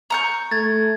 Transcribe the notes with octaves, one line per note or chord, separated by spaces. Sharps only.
A#5 C#6 G6
A3 G#6 A6